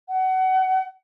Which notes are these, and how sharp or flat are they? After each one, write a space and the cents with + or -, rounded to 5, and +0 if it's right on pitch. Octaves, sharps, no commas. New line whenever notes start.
F#5 +25